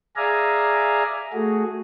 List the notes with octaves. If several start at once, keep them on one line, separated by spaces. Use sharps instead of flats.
G#4 D5 E5 F5 G#5 A#5
A3 F#4 G#4